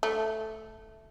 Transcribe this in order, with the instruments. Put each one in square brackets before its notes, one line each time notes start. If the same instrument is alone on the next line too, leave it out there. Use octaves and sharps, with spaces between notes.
[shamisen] A3